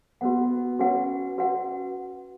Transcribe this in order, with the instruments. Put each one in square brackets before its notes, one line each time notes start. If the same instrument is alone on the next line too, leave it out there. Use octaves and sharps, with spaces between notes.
[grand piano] B3 [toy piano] F#4 B4 F#5
[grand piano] C#4 [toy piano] F#4 B4 F#5
[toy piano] F#4 B4 F#5